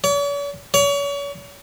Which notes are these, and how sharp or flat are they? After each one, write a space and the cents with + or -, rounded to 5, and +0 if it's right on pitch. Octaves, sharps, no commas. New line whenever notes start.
C#5 +45
C#5 +35